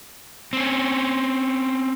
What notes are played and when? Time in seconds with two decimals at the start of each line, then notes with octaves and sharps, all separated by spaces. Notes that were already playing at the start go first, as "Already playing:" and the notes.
0.53 C4 C#4